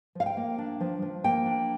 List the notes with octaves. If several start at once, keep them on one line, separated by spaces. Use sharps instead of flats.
F3 F5
G5
A#3
D4
F3
F3
A#3 G5
D4